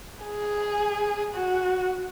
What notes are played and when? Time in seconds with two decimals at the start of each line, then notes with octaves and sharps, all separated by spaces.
0.25 G#4
1.34 F#4